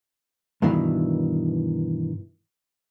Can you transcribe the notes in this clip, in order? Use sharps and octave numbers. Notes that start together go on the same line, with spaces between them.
G2 B2 D#3 E3